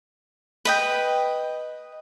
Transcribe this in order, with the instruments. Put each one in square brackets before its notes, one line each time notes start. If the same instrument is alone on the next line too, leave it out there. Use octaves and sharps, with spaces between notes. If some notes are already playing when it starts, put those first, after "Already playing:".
[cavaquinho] B4 D#5 G5